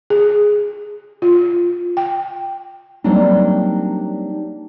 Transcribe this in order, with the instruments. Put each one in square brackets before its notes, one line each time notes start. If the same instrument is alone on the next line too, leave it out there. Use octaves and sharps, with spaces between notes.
[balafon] G#4
F4
G5
[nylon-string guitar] F#3 G3 A#3 C4 D4 D#4